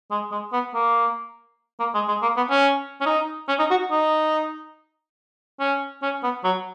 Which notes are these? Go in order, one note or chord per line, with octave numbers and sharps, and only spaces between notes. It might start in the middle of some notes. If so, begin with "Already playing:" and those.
G#3
G#3
B3
A#3
A#3
G#3
G#3
A#3
B3
C#4
C#4
D#4
C#4
D#4
F#4
D#4
C#4
C#4
B3
F#3